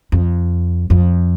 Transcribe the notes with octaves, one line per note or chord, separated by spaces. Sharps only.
F2
F2